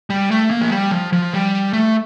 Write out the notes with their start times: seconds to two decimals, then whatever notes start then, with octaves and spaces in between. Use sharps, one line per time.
0.10 G3
0.31 A3
0.51 A#3
0.61 F3
0.72 G3
0.91 F3
1.13 F3
1.33 G3
1.73 A3